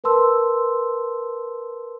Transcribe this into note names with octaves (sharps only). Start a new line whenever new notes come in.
A#4 B4 A5 C6 E6